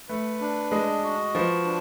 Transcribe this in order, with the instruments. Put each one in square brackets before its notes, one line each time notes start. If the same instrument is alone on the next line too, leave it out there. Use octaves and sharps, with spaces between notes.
[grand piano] A3 [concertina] B4
[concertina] D4
[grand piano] G#3 [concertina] D#5
[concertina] F#4
[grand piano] F3 [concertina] B4
[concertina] D4